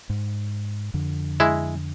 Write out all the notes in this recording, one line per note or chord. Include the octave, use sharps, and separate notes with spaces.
G#2
F2 D3
G#3 E4